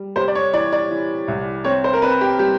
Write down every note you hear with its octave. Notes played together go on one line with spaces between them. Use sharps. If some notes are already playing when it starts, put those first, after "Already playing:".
Already playing: G3
C3 C5
D5
C#5
E3 D5
D5
E3
C2
C4 C#5
C5
A#4
C4 B4
G4
G3 G4